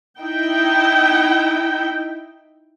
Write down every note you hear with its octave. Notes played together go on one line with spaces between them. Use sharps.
D#4 E4 G5